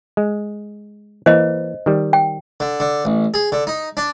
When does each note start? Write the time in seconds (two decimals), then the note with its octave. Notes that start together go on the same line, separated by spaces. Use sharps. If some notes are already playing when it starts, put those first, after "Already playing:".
0.17 G#3
1.26 E3 A#3 C5 D#5
1.86 D#3 G3
2.13 G5
2.60 D3
2.80 D3
3.05 A1
3.34 G#4
3.52 D3
3.67 D#4
3.97 D4